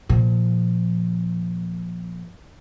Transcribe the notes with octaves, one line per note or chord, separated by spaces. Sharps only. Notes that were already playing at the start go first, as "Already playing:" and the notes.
A#2 F3